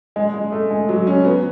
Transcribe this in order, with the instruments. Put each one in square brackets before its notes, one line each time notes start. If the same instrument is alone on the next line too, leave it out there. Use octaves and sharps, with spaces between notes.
[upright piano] G#3
G#3
A3
G#3
F#3
C#4
B3